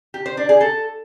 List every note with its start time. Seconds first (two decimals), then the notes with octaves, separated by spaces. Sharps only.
0.14 G4
0.26 C5
0.37 D4
0.49 G#4
0.61 A4